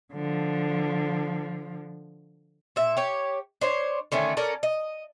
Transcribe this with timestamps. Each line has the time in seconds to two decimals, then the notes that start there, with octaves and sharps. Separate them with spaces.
0.13 D3 F3
2.76 A#2 E5
2.97 G4 C#5
3.61 D4 C5 C#5
4.12 D3 D#3 A3 C#4
4.37 C#4 A4 A#4 D5
4.63 D#5